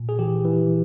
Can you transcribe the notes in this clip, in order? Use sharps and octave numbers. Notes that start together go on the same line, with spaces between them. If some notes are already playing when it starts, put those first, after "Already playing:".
Already playing: A#2
G#4
E3 G4
E3